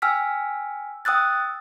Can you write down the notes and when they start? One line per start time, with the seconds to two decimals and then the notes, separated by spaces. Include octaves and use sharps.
0.02 G5 G#5 E6 F6 B6
1.05 G5 D#6 E6 F#6 A6